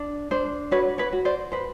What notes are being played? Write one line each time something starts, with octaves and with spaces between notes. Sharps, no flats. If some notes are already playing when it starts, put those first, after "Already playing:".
Already playing: D4
D4 C5
F#4 B4 C#5
B4 C#5
F#4
C5 D5
B4 C5